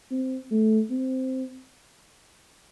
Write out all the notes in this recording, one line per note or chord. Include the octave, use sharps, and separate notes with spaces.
C4
A3
C4